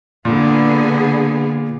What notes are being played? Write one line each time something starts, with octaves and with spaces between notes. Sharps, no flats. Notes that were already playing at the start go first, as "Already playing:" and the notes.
A#2 D3 B3 G#4